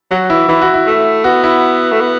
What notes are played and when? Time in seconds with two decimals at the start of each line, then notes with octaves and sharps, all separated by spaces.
0.11 F#3 F#4
0.30 E3 E4
0.48 E3 E4
0.62 F#4
0.74 E4
0.87 A3
1.24 B3 F#4
1.44 E4
1.92 A3
2.01 B3